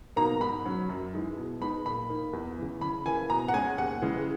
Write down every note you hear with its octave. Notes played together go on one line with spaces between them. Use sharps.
B2 A#3 D#4 A#5
G#2 B5
F#3 C#4
F#2
E3 G#3 D#4
B2
G#3 B3 D#4 B5
A#2 B5
A#3 D#4
E2
C#3 E3
C#3 B5
E3 A#3 G#5
B2 A#5
F#5
G#3 C#4 G#5
D#2 F#5
C#3 E3 G#3